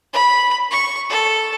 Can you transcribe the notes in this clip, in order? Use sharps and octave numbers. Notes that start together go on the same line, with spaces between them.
B5
C#6
A4